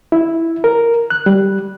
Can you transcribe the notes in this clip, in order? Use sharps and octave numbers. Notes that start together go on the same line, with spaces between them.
E4
A#4
F#6
G3